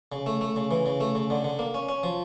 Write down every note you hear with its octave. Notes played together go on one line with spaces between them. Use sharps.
C#3
A3
A3
C#3
E3
C#3
A3
C#3
D3
D3
A#3
C#4
C#4
F3